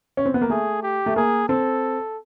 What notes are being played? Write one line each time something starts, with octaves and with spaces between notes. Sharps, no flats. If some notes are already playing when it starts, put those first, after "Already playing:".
C#4
C4
B3
A#3
A3 G#4
G4
A3
A#3 G#4
C4 A4